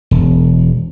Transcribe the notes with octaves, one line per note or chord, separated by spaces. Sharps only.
E1